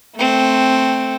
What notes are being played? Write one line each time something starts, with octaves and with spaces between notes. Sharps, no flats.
A3 C4